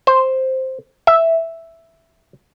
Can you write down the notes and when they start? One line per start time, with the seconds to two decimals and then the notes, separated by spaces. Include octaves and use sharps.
0.07 C5
1.07 E5